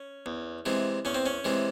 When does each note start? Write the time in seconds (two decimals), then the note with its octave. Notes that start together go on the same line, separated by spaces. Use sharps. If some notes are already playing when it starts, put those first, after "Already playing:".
Already playing: C#4
0.26 E2
0.66 C3 E3 G#3
1.05 E2 C#4
1.15 C4
1.26 C#4
1.44 C3 E3 G#3